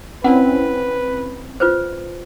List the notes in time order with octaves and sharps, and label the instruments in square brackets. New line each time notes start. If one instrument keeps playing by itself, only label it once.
[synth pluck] C4 C#4 E4 [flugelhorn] B4 [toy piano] F#5
[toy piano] F4 B4 C5